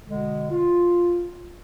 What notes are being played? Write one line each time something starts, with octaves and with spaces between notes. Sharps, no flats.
B2 D3 G#3
F4